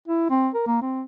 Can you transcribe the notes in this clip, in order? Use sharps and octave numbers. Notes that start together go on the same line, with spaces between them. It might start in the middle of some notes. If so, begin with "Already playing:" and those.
E4
C4
A#4
A#3
C4